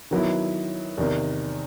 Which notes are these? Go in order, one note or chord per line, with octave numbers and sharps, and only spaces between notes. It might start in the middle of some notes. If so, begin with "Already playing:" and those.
D#3 F#3 B3 E4
E2 C3 D#3